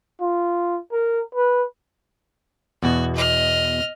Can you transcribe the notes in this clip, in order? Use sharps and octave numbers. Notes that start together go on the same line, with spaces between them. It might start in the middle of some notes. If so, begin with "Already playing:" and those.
F4
A#4
B4
E2 B2 F#4
D#5 F6